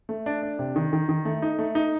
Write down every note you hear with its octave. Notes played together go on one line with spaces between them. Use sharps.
A3
D4
D4
C3
D#3
D#3
D#3
A3
D#4
A3
D#4